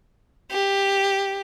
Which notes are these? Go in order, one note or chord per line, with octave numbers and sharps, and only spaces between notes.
G4